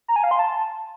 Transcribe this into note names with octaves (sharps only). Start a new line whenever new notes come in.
A#5
G#5
F5
C6
A5